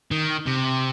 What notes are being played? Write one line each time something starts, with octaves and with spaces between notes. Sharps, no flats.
D#3
C3